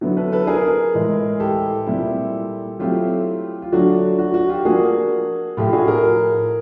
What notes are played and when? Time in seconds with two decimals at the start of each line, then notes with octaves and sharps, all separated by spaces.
0.01 D3 F#3 B3 E4
0.17 A4 B4
0.32 A4 B4
0.47 G#4 A#4
0.94 A2 E3 G#3
1.40 G4 A4
1.87 A#2 G3 C4 E4
2.79 F#3 A3 C4 E4 F4 G4
3.62 F4
3.72 D3 F#3 A3 D4 F#4
4.19 F#4
4.34 F#4
4.49 F4 G4
4.65 F3 A#3 D4 F#4 G#4
5.57 A2 F3 A3 F4 G4
5.72 F#4 G#4
5.88 G#4 A#4